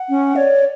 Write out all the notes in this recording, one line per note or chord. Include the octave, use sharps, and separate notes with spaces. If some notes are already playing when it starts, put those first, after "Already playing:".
Already playing: F#5
C#4
C#5 D5